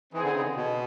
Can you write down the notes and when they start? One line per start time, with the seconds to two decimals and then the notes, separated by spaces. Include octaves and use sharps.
0.12 E3 C4 D#4 G#4 B4
0.24 D3
0.35 C#3
0.56 B2